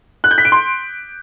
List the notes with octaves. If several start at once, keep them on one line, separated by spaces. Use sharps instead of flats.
F#6
G6
B6
D7
C6